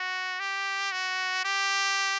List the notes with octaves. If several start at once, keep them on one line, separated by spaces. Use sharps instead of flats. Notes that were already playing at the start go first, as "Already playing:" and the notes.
Already playing: F#4
G4
F#4
G4